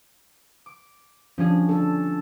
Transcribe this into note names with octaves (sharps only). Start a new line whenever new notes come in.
D6
F3 G3 C#4 D4 G#4
D4 A4